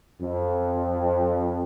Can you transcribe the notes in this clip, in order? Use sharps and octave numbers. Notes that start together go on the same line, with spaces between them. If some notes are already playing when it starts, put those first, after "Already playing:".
F2